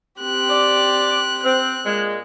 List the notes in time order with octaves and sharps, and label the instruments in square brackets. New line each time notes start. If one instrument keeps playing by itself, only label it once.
[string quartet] C4 G4 F#6
[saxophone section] D5
[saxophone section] C4 [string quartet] F#6
[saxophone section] A#2 G#3